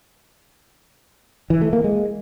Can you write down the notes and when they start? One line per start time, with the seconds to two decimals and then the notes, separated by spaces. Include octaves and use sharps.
1.50 E3
1.62 A3
1.73 A#3
1.84 G#3